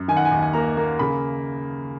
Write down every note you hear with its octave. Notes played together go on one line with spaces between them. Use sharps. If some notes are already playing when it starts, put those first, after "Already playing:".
Already playing: F#2
D#3 G#5
F#5
G#5
D#2
G#5
A#3 A#5
A#3
C#3 B5